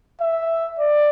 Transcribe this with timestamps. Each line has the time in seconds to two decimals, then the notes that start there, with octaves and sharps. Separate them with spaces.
0.21 E5
0.80 D5